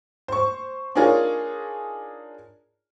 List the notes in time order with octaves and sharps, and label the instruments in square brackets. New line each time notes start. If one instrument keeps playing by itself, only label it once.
[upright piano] C5 C#6
D4 D#4 F4 G#4 A#4 C#5